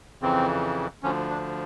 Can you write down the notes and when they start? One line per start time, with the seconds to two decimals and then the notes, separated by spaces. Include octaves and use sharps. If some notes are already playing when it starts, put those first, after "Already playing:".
0.21 F2 C#3 E3 C4
1.03 D2 D3 F3 C#4
1.30 D4